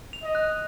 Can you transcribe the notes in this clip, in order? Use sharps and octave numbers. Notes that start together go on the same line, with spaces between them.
F7
D#5
F#6